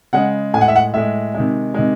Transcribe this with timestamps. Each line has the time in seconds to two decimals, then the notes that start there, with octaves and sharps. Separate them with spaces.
0.13 C#3 G#3 F#5
0.54 A2 G#3 G#5
0.61 F#5
0.68 E5
0.76 F#5
0.94 A2 G#3 E5
1.34 C3 D#3 G#3
1.74 C3 D#3 G#3